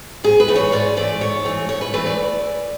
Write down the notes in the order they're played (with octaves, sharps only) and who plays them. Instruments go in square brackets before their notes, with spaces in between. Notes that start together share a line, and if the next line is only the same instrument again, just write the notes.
[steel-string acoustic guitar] G#2 G#4
B4
E3 A3
C#5
G#2 D5
E3 A3 D5
G#2 C#5
E3 A3
G#2 C#5
B4
E3 A3 B4
D5